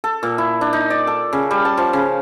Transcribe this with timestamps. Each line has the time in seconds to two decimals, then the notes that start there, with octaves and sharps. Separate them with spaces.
0.04 A4
0.23 A#2
0.38 E4
0.61 D4
0.73 D#4
0.90 D5
1.07 A4
1.33 C#3
1.51 G3
1.65 A5
1.77 F3
1.93 C#3